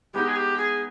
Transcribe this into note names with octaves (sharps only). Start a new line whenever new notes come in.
G#3 B3 D#4 G4
G#4
G4
G#4